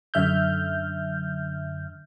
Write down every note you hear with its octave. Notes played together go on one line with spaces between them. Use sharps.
F#2 D3 E5 F6 G6